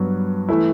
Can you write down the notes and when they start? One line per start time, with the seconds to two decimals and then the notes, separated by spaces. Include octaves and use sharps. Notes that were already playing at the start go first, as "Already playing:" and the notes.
Already playing: G2 F#3 B3
0.49 E3 A3 E4